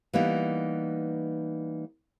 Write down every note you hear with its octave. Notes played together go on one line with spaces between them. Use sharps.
E3 G3 A#3 B3 D#4